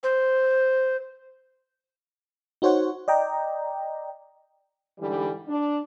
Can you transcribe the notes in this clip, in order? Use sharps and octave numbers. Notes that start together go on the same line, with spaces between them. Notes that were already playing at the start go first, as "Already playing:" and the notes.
C5
D#4 F#4 C5 C#5 F#5
D5 D#5 G5 A#5
G#2 D3 E3 G3
D4